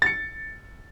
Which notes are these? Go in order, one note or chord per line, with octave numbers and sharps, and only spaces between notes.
A6 C#7